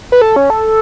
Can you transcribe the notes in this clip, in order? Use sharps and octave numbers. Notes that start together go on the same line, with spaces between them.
B4
A4
C#4
A4